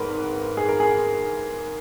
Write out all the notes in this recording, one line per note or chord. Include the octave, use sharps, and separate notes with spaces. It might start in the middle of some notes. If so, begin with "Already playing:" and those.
Already playing: G#1 G#2 A#4 B4
G#4
A#4
G#4